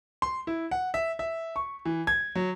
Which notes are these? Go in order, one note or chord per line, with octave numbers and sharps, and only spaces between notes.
C6
E4
F#5
E5
E5
C#6
E3
G#6
F#3